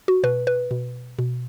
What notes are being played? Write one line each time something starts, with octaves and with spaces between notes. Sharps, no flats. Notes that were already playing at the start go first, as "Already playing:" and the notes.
F#4
B2 B4
B4
B2
B2